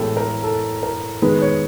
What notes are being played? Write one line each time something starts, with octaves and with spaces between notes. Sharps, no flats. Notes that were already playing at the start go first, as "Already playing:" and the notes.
Already playing: A2 E3 G#3 B3 G4 A4
A#4
A4
A#4
D#3 G#3 B3 B4
C#5